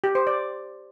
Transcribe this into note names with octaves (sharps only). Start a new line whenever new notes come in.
G4
C5
D5